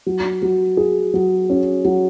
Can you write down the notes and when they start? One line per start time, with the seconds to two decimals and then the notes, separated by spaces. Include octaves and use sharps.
0.06 F#3
0.42 F#3
0.77 G#4
1.14 F#3
1.50 C#4
1.85 F#3